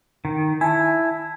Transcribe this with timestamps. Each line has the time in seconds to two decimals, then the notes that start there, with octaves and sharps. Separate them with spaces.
0.25 D#3
0.61 E4 G#5 A5